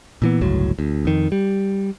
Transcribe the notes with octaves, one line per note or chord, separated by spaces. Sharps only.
A#2 E3 B3
G1 C#2 A2 F#3
D2
F2 D#3
G3